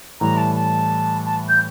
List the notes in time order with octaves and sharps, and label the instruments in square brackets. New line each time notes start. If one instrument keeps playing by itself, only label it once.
[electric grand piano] A2 E3 G3 [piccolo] A#5
[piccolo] A5
A5
A5
G6